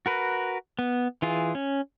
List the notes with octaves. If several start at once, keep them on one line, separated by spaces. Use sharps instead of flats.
F#4 A#4 B4
B3
E3 F4 G#4
C#4